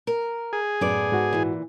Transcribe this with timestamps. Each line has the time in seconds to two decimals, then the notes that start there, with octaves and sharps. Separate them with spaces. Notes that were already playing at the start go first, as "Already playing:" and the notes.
0.07 A#4
0.53 G#4
0.81 F#2 A2 B3 A4 D5
1.12 G#2 F#4 F#5
1.33 A#2 E3